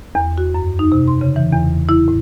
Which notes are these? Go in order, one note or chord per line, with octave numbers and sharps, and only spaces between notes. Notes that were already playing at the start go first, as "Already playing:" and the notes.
E2
F#4
F#2
D#4
C3
C6
C#3
E3
E2
E4
A2